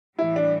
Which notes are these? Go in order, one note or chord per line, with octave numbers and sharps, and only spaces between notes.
A2 E3 G3 E4
D4